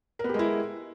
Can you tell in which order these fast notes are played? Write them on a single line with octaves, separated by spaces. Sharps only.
A#4 B3 G4 G#3 E4